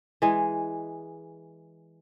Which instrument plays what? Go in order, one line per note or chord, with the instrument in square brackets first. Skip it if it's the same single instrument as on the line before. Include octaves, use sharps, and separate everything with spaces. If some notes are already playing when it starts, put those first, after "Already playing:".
[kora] E3 G#3 G#4